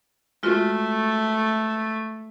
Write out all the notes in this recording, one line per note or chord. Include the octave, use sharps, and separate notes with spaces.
G#3 A3 F4 F#4